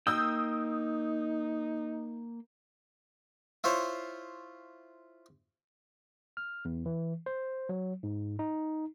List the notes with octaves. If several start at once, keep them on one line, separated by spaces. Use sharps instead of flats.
A#3 D#4 G5 D#6 E6 G6
E4 F4 C5 C#5
F6
E2
E3
C5
F#3
G#2
D#4